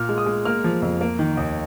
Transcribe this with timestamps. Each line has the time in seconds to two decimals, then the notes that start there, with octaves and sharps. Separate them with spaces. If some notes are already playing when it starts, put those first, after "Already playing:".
Already playing: A#2 F6
0.09 G#3
0.18 D#6
0.26 G#3
0.45 A#3 F6
0.64 F3
0.82 F2
1.01 A#3
1.19 D#3
1.37 D#2